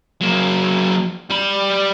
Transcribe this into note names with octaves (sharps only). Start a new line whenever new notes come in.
F#3 A#3
G3 B5